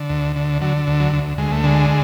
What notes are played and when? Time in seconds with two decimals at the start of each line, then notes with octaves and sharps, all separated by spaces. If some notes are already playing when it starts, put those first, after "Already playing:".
Already playing: D3
0.10 D2
0.36 D3
0.61 D3 F#3
0.87 D2
1.00 F#3
1.13 D2
1.38 D2 G#3
1.52 A3
1.64 D3 G#3